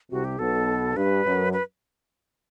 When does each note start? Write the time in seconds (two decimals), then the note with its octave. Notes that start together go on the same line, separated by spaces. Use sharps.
0.11 C2 C3 F#4
0.25 G4
0.38 B1 B2 A4
0.95 G2 B4
1.25 F#2
1.53 B4